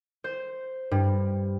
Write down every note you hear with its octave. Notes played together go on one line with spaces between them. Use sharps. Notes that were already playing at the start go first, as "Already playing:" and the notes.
C5
G2